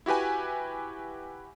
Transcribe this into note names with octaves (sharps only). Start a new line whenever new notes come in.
E4 F#4 G4 B4 G#5